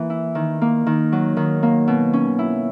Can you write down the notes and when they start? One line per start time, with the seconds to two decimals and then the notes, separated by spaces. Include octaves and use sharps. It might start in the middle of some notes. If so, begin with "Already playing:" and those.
Already playing: E3 A#3
0.10 E4
0.35 D#3
0.61 A#3
0.86 D#3
1.12 F#3
1.37 D#3
1.63 A#3
1.88 B2
2.13 C#4
2.39 E4